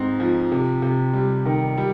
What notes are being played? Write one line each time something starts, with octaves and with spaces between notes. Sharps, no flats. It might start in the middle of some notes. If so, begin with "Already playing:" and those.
Already playing: G#2 C4 D#4
F3
C3
C3
G3
D#3
G3